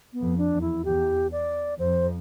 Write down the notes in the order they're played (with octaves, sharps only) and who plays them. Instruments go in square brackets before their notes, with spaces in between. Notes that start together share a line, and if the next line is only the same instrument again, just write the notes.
[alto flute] B3
[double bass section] F2
[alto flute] D4
[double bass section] E2
[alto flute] E4
[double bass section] E2 [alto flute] G4
[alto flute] D5
[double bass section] F2 [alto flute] C5